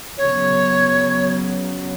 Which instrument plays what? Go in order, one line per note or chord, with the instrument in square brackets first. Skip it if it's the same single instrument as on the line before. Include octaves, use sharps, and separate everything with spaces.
[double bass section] C#3 F#3 B3 [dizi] C#5